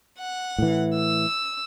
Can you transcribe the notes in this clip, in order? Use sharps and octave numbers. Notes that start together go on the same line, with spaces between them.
F#5
A2 E3
E6